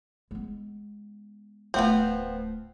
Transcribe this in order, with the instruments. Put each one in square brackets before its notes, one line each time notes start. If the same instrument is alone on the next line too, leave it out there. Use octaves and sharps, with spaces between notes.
[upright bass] G#3 B3
[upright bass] D1 A3 [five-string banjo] F3 B3 C4